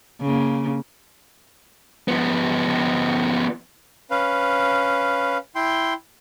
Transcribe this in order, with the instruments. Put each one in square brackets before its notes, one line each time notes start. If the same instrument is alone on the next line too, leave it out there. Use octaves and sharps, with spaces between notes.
[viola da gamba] C#3 A#3
[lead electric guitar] F3 B3
[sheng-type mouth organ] C#4 B4 F5
E4 G5 C6